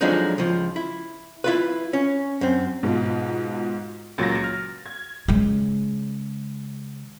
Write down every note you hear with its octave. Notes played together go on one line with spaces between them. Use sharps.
D3 F3 F#3 G#3 D4 D#4
C#2 F3
E4
E4 F4 B4
C#4
F#2 C4
G#2 B2 F4
C#2 A#2 F#3 A6 A#6
F6
G#6
C#3 G#3